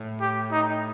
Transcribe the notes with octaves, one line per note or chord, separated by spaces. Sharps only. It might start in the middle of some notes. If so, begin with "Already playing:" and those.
Already playing: A2
G4
D#4